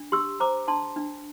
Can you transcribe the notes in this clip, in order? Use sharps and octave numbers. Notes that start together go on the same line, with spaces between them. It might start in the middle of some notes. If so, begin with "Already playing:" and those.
Already playing: D4
G4 C6 E6
C5 A#5 D6
D4 A5 C6
D4